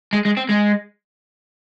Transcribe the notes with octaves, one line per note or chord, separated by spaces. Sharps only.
G#3
G#3
C4
G#3